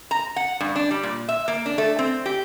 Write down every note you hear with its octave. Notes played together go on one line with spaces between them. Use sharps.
A#5
F#5
G2
D4
G3
A#2
E5
A#3
D4
A3
C4
G4